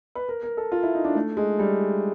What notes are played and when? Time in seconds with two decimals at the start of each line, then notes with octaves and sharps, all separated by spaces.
0.15 B4
0.29 A#4
0.43 A#4
0.57 A4
0.72 F4
0.83 E4
0.94 D#4
1.04 D4
1.15 A3
1.37 G#3
1.59 G3